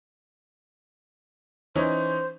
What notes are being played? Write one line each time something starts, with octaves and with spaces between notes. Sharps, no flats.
E3 C#4 D#4 C5